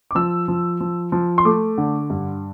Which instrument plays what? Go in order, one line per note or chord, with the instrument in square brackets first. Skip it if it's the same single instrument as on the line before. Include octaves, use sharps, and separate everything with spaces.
[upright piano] D6
F3 E6
F3
F3
F3
C6
A3 D6
D3
G2